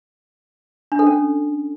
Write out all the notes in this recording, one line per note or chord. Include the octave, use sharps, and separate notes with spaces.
D4
A4
C#4